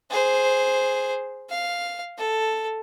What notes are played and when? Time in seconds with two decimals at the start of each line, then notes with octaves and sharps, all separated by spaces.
0.10 G#4 C5
1.50 F5
2.18 A4